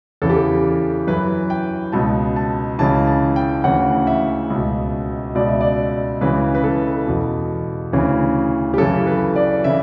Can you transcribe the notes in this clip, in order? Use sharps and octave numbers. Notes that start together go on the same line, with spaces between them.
E2 C#3 E3 A4
G4
A4
F#2 E3 B4
G5
C#2 B2 A5
A5
C#2 C#3 E3 A5
A5
G5
D2 C#3 E3 F#5
E5
C#2 B2
C#2 B2 D5
E5
D5
C#2 C#3 E3 B4
B4
A4
E2 B2
D2 C#3 E3
G4
F#2 C#3 E3 A4
B4
D5
C#3 E3 E5